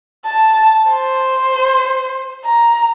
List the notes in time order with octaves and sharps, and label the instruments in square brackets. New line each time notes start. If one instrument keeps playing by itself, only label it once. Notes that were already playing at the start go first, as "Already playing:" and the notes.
[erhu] A5
C5
A#5